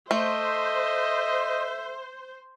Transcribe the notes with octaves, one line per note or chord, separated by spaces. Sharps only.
A3 C5 D#5 E5